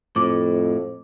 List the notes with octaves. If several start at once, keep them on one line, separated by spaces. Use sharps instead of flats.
F2 A2 D6